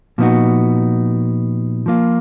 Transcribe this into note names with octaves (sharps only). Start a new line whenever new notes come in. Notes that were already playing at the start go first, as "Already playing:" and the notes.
A#2 F3 B3 D#4 F#4
F3 A#3 F4